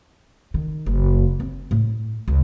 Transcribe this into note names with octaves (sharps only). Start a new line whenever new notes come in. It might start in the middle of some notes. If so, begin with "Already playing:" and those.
D#3
F#1
C4
A2
C#2